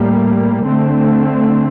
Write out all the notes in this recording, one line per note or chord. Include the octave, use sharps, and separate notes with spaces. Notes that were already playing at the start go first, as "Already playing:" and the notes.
Already playing: A2 G3 A#3
D3 A3 C4